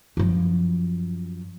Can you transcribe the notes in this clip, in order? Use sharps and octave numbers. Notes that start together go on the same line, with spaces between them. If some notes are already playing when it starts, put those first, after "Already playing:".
F#2 F3